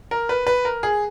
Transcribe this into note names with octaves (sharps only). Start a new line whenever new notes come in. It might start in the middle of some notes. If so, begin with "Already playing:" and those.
A#4
B4
B4
A#4
G#4